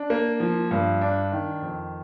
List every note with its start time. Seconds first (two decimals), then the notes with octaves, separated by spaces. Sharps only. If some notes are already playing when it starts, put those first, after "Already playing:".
Already playing: D4
0.10 A#3
0.40 F3
0.71 G2
1.01 D4
1.32 D#3
1.62 F2